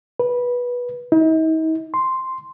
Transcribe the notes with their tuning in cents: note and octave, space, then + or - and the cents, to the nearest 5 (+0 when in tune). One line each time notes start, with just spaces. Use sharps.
B4 -15
D#4 +45
C6 +0